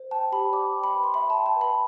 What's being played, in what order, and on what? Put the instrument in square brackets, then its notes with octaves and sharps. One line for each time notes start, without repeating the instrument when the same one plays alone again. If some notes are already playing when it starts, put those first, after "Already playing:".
Already playing: [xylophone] C5
G5 A5
G4 B5
D5 D6
G5
B5
B4
C6
E5 B5
A5
G5
A5
B4
B5